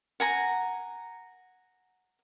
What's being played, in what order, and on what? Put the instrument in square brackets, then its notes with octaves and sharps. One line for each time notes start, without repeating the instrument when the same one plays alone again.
[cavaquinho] F#5 G#5 A#5